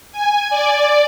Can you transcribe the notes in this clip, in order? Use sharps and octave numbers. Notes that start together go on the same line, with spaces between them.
G#5
D5